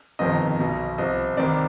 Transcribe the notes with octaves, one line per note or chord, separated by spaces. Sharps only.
G1 F2 C3 D#3 D#5
B1 B2
C2 C3 F3 D#5
C2 C3 D#3 D5